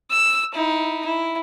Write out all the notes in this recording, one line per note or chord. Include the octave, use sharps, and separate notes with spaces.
E6
D#4 E4
E4